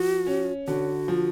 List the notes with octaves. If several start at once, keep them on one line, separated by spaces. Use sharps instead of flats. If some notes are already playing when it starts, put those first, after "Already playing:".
Already playing: F3 F#4
C#4
D3 F#4
F3